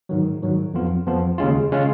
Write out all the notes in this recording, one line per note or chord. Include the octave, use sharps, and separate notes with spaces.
G#2 D#3 F#3
G#2 D#3 F#3
F2 F3 B3 F4
F2 F3 B3 F4
D#2 C#3 G#3 C#4 F4
C#3 G#3 C#4 F4